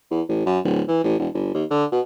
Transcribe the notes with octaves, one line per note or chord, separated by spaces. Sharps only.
E2
A1
F#2
D1
E3
A1
E1
G1
D#2
D3
B2